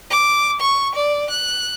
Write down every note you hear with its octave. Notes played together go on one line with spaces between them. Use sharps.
D6
C#6
D5
F#6